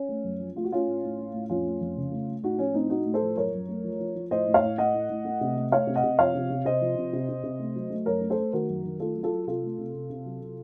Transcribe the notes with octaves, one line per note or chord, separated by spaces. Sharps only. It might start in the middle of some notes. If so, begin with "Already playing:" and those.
Already playing: C#4
A3
F#2
F3
A3 F4
F#4
A3 C#4 F4
A2
A2
A3
A2
F2 C#4 F4
A3
F2
C#3
A3
A3
A2 D#4 F#4
F3 C#4
A2 C4 D#4
A3 D#4 F#4
A2
A4 C5
F3
F#2 A#4 C#5
F#2
A3
F3
F3
F3
A2 C5 D#5
A2
C#5 F5
A2
A3 D#5 F#5
A2
A2
A3
C3
A3
A3 C#5 F5
C3
D#5 F#5
C3
F3 C#5 F5
C3
C3
C3 C5 D#5
F3
C3
C3
C3
C3
A3
F#3
A3
F#2 A#4 C#5
A3
A4 C5
A3
D#3 F#4 A#4
F#2
D#3
A3 F4 A4
F#3
F4 A4
F#3
C3 F4 A4
A3
C3
C3
C3
F#3
C3